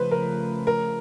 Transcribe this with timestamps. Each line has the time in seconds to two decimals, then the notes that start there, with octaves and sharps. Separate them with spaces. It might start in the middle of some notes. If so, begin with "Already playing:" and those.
Already playing: C#3 F3 A3 B4 C5
0.11 A#4
0.67 A#4